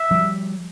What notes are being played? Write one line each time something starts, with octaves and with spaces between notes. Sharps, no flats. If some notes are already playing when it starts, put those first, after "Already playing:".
Already playing: E5
F3 G3